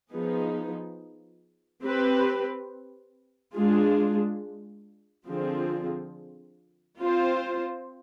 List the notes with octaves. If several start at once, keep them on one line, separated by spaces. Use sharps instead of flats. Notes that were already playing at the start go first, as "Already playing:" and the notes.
F3 B3 D#4 G#4
C4 G4 B4
G#3 D4 F4 G#4
D3 F3 C4 F4 G#4
C4 F4 C5